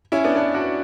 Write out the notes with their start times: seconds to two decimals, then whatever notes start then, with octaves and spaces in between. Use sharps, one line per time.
0.12 C#4 E4
0.24 B3 D4
0.36 B3 D4
0.54 D4 F#4